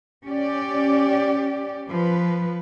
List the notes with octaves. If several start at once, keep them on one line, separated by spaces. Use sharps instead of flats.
C#4 G4 D5
F3 B4